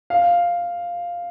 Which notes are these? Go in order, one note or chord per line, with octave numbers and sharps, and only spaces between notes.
F5